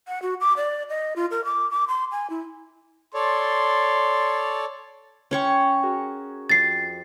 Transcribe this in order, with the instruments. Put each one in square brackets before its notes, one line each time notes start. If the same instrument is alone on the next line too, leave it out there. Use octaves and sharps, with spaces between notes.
[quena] F#5
F#4
D6
D5
D#5
F4
A#4
D6
D6
C6
G#5
E4
[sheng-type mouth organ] A4 C#5 D5 [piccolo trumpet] C6
[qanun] C#4 C#5 C#6 [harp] G5 C6 F6
[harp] F#4 G#4 A#4
[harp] F2 [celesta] A6 C7